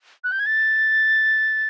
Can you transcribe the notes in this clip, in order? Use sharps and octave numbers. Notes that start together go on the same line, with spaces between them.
F#6
G6
G#6
A6